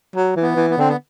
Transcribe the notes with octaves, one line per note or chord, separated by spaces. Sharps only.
F#3
E3
B3
E3
B3
D3 C4
B3